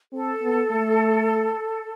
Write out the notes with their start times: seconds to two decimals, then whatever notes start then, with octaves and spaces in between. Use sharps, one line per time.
0.13 C4 A4
0.42 B3
0.71 A3